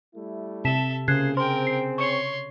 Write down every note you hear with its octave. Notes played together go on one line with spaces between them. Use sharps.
G3 A3 E4
C3 A4 E5 A5 B6 E7
C#2 C#3 A#3 G#4 C5 F#6 G#6 C7
C4 G#4 A#4 C5 G5 C6
C7
C#5 C6 C#6 C#7